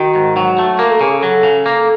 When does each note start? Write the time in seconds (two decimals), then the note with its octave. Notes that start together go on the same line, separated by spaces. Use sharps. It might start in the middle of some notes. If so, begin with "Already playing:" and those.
Already playing: D#3 F#4
0.15 G#2
0.37 F#3
0.59 A3
0.79 A#3 A#4
0.91 A4
1.01 C#3 G#4
1.12 A4
1.23 F#3
1.43 C#3
1.66 A#3